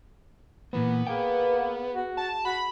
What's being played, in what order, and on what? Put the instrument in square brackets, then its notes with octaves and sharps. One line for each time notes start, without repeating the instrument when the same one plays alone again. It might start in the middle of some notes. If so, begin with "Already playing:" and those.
[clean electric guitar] A#2 E3 A#3 [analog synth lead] B3
[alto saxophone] A#3 [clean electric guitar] G#4 G5
[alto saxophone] F#4
[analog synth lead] A5
[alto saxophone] F#4 [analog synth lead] B5